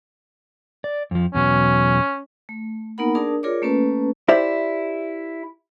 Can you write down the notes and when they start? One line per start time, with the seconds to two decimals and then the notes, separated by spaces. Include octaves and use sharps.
0.84 D5
1.11 F2 F3
1.34 E2 B2 F#3 C#4
2.49 A3
2.98 A#3 B3 D#4 A#4 F#5 B5
3.15 D4 G#4 A#4 D5 A5 D#6
3.43 F4 G#4 A#4 C#5 D5 D6
3.62 A3 A#3 C#4 A4 B4 A5
4.28 E4 G4 C5 D5 E5